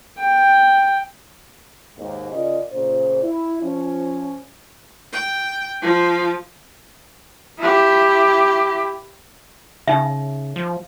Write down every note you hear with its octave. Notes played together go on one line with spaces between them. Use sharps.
G5
D#2 G#2
C#3 F4 A#4 D5 D#5
A#2 C#3 C5
E4
F3 C#4
G5
F3
E4 G4
C#3 D#4 E5
F3